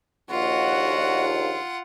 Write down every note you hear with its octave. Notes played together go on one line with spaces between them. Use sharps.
A#1 D#2 F4 F#4 F#5